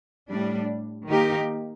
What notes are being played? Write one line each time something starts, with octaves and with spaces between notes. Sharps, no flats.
A2 G3 D4
D#3 A#3 D#4 G4 A#4